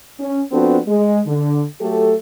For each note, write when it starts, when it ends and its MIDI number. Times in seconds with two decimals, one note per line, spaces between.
0.20 0.42 61
0.52 0.79 53
0.52 0.79 59
0.52 0.79 60
0.52 0.79 62
0.52 0.79 66
0.52 0.79 69
0.87 1.20 56
1.27 1.64 50
1.81 2.15 54
1.81 2.15 57
1.81 2.15 67
1.81 2.15 69